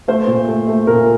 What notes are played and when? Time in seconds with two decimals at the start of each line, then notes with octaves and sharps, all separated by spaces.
0.08 A3 C5
0.27 A#2
0.48 A3
0.67 A3
0.87 A#2 A#4